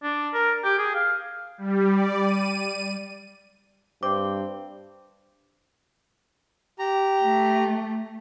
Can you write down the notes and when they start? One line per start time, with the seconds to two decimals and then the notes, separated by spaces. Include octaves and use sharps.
0.03 D4
0.33 A#4
0.64 G4
0.78 G#4
0.95 F5
1.58 G3
1.89 D5
2.22 D#7
4.03 G2 C4 D6
6.79 G4 A#5
7.23 A3